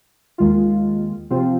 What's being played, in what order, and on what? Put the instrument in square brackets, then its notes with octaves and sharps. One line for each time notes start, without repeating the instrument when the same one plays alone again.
[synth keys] D#2 D#3 G#3 F4
C3 F3 C4 F4